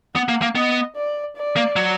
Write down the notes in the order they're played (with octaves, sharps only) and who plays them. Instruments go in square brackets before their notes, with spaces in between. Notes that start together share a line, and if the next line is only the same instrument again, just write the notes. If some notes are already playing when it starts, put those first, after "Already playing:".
[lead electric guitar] B3 [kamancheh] F#5
[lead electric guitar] A#3
A#3
[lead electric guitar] B3 [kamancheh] D#5
[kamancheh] D5
D5
[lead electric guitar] A#3
F#3